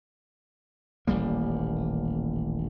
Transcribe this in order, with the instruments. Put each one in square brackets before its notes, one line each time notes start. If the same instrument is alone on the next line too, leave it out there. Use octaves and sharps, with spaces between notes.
[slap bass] D#1 A1 G3 A#3